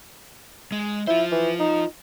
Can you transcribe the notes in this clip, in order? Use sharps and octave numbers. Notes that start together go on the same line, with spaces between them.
G#3
E4 F4 C5
E3
D#4